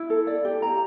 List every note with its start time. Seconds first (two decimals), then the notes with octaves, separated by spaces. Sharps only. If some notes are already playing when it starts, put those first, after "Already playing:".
Already playing: E4
0.10 A4
0.27 D5
0.45 G4
0.62 A#5